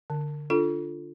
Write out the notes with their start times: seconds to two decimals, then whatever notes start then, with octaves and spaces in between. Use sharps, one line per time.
0.10 D3
0.50 D4 F4 A4